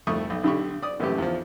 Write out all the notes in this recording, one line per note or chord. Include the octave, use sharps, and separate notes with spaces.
C2 F2 A3 C#6 D#6
B1
B1 D3 G4 B5 C#6
D5 D#6
A#1 F#2 C3 E3 A3 G4
E2 F3